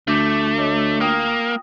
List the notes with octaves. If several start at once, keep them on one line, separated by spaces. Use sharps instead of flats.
D2 A3 D6 G6 A#6
C#6 D6 B6
C#5 D#5 D6
A#3 F4 G5 D#6